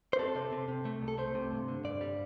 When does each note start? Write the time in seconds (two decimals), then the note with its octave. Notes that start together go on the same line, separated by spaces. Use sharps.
0.13 C5
0.19 C4 A4
0.35 C3
0.52 C3
0.68 C3
0.85 A3
1.01 C2
1.08 A4
1.18 A3 C5
1.35 C3
1.52 G2
1.68 D3
1.84 G2 D5
2.01 G3